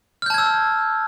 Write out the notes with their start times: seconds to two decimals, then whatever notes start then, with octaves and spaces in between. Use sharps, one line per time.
0.22 F6
0.26 G6
0.30 A5
0.34 G#6
0.38 E6